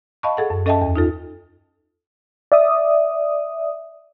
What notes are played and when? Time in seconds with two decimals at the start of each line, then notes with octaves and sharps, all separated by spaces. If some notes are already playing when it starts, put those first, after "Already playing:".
0.23 D#5 F5 A5 B5 C#6
0.37 G#4 A4 F#5
0.50 F#2
0.66 C#4 A4 D#5 E5 G5 A5
0.82 E2
0.96 D#4 F4 A4
2.52 D5 E5 D#6